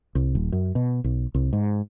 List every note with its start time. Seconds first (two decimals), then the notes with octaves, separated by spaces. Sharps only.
0.15 C2
0.35 D#1
0.52 F#2
0.75 B2
1.04 B1
1.34 C2
1.53 G#2